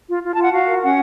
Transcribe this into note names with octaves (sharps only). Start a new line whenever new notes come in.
F4
F4
F4 A5
F#5
F#4 F5
A#4
C#4 F#5